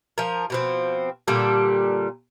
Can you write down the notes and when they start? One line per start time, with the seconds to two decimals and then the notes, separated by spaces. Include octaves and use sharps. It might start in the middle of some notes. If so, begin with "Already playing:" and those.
0.18 F3 A#4
0.50 B2 F3 C4
1.28 A#2 D3 G3 A4